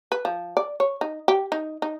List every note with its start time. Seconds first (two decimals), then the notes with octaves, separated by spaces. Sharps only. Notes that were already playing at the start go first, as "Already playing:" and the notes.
0.12 B4
0.25 F3
0.57 D5
0.80 C#5
1.01 D#4
1.28 G4
1.52 D#4
1.82 D#4